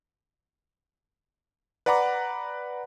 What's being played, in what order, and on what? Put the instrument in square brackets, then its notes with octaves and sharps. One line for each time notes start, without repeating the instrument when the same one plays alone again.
[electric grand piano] B4 D5 F#5 A#5 B5 D6